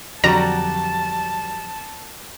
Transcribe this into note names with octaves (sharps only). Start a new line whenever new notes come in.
F2 D3 F#3 G3 F#4 D5 A5 A#5